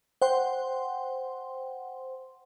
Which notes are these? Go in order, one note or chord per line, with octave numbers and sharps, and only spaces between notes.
C5 F#5 G5 C6